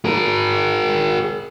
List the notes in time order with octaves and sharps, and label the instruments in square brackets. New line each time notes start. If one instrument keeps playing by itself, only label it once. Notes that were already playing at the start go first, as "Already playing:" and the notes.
[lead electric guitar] G#4 A#4